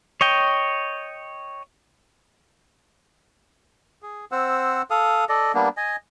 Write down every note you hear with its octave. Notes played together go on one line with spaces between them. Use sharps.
C#5 D#5 G5
G#4
C4 C5 F#5 E6
A4 F5 D#6
A4 D5 D#5
G3 A#3 B3 D4
D#5 G#5